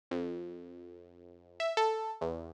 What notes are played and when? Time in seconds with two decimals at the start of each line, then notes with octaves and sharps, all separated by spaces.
0.11 F2
1.60 E5
1.77 A4
2.21 E2